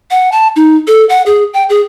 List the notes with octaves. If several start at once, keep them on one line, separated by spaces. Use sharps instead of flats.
F#5
A5
D#4
A4
F#5
G#4
G5
G#4